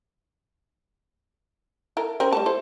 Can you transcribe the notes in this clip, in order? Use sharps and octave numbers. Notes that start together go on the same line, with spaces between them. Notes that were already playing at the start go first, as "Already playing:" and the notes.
E4 A4 A#4
C4 C#4 A#4
G3 A3 A5
E4 A4 C5